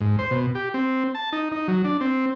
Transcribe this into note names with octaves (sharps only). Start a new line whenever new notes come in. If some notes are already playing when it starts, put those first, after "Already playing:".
G#2
C5
B2
G4
C4
A5
D#4
D#4
F#3
D4
C4